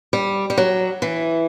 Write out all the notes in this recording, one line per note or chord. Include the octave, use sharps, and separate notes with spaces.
G3
G3
F#3
E3